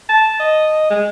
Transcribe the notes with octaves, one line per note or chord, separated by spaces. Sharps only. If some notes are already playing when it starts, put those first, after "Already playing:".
A5
D#5
G#3